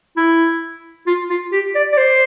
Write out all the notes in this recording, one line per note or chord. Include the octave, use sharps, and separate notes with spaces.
E4
F4
F4
G4
D5
D5
C5